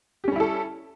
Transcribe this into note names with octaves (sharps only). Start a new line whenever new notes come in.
G3 C#4 E4 G4 A4